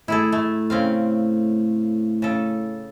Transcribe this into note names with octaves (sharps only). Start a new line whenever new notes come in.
A2 E4 G#4 A4
A3
C#3 C4 F5
C#3 A4